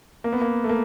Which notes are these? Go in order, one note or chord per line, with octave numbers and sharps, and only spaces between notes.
A#3
B3
A#3
A3
A#3